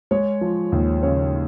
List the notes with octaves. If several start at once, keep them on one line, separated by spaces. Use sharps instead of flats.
G#3 C#5
F3
D#2
C#3 C#5